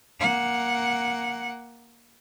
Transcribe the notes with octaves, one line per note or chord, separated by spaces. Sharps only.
A#3 F#5